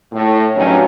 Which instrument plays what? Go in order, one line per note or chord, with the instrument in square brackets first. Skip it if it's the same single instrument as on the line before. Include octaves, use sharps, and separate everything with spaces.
[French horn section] A2
G2 D#3 F#3 C#4